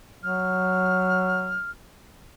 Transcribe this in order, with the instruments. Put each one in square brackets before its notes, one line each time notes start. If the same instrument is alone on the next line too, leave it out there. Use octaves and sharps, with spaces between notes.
[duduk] F#3 [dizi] F6